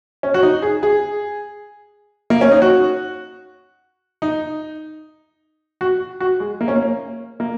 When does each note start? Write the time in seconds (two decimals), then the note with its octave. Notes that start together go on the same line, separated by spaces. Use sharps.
0.23 C#4
0.34 F#4
0.43 D#4
0.62 G#4
0.83 G#4
2.30 A#3
2.41 C#4
2.52 D#4
2.62 F#4
4.22 D#4
5.81 F#4
6.20 F#4
6.40 G#3
6.61 A#3
6.68 C#4
6.75 A#3
7.40 A#3